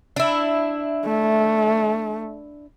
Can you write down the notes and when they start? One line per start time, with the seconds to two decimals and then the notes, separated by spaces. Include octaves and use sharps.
0.16 D4 E4
1.06 A3